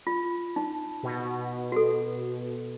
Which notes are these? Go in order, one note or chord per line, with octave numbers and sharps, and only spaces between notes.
F4
D#4
B2
F#4 A4